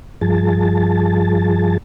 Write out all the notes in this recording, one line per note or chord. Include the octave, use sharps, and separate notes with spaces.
G2 F3 G#4 A5